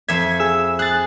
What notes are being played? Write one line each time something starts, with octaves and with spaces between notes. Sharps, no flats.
F2 E5 G#6
G#4 E6
G#4 F#6 A6